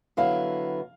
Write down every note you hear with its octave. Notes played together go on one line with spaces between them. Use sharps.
D3 F#3 B3 E4 F5